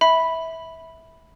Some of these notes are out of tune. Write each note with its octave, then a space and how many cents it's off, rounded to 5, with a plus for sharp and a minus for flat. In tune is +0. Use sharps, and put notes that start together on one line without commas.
E5 -20 B5 +0